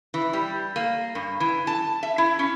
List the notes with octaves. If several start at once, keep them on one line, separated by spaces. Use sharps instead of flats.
E3
G3
A#3
G2
E3
A5
E5
E4
C#4